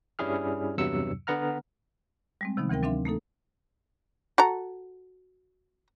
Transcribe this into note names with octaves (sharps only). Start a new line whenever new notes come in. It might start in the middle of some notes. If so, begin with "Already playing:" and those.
G2 G3 C#4 E4 G#4 F6
E2 G2 C3 F#3 E6 C#7
D3 B3 F#5 A#5 F6
G3 G#3 C4
C3 D#3 F3 B3 D#4
D2 E3 C4 A#4 G5
F#3 C4 D4 E5 F5 C6
A3 A#3 D#4 A4
F#4 A4 A#5